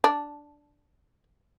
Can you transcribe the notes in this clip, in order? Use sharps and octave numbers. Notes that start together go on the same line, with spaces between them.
D4